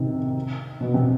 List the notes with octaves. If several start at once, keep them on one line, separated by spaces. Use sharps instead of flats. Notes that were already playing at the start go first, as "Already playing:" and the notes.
Already playing: C3 D#3
B2
C3